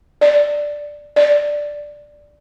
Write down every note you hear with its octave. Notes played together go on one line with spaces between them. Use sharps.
D5
D5